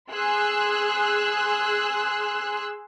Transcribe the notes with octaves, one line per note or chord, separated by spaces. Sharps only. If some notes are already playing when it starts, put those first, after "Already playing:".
G#4 C6 E6 F#6